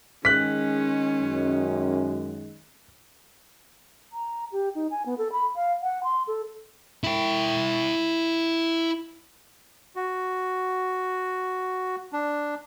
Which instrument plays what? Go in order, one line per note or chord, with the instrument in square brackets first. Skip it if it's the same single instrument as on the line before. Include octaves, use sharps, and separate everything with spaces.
[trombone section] D#3 G#3 [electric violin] C#4 [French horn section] G#4 [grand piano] F#6 B6
[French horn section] F#2
[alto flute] A#5
G4
D#4
G#5
B3
A4
B5
F5
F#5
C6
A4
[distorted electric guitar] E4 G5
[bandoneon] F#4
D4